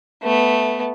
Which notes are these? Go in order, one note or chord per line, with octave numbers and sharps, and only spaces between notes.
A3 B3